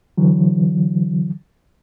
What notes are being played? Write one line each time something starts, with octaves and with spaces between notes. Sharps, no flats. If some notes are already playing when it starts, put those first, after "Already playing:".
D3 E3 F#3